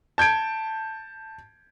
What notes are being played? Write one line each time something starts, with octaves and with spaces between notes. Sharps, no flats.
A5 G6 G#6 D7